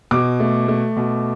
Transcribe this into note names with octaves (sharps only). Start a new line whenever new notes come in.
B2 D6
A3
A3
B2